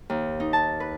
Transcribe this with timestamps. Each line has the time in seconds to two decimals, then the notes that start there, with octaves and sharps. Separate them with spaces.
0.10 D#2
0.40 D#4
0.53 A5
0.80 B4